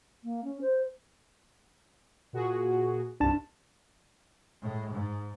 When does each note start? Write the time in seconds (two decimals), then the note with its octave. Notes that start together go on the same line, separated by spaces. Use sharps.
0.24 A#3
0.44 C#4
0.61 C5
2.33 A#2 F#4 G#4
3.20 C2 G2 D4 A5
4.62 A2 G#3
4.92 G#2